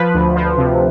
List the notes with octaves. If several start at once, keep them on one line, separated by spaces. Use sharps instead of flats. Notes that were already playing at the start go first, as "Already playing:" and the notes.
Already playing: F3 B4
D2
F3
C3